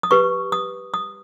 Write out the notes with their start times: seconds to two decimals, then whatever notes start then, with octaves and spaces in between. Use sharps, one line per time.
0.03 D#6
0.11 G4 B4 C#6
0.52 D#6
0.94 D#6